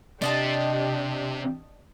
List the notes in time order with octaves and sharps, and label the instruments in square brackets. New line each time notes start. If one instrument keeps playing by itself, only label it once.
[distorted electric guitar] C3 [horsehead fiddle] D4 G4 [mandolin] D5 D#5 A5